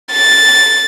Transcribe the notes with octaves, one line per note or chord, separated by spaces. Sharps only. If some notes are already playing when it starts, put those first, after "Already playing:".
A6